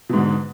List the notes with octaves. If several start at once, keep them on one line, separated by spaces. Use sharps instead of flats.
G#2 B2 D3